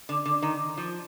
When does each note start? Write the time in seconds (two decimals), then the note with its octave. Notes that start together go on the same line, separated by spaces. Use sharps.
0.09 D3
0.26 D3
0.42 D#3
0.77 F3